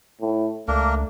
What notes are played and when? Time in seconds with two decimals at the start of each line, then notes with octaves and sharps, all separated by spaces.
0.21 A2
0.68 C#2 A3 A#3 D4 A#4